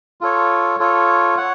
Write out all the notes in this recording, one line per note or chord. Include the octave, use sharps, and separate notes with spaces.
F4 A4 C#5
F4 A4 C#5
C#5 F#5